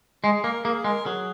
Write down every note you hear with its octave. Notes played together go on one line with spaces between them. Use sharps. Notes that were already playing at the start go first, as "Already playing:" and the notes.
G#3 G#4
A#3 A#4
A#3 G#4
G#3 A#4
F#3 G#4